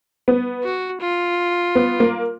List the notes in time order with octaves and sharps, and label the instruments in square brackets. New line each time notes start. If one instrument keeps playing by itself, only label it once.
[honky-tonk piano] B3
[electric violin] F#4
F4
[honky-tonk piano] B3
A#3